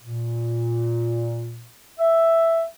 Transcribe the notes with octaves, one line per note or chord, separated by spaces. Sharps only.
A#2
E5